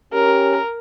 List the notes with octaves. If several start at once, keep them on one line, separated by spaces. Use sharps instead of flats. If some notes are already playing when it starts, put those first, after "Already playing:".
C#4 G4 A#4